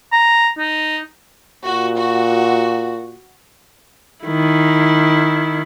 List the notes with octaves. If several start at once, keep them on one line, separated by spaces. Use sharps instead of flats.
A#5
D#4
A#2 F#4
F#4
D#3 E4